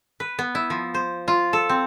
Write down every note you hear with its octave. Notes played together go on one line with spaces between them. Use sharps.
B4
B3
E4
F3
C5
F4
A4
C4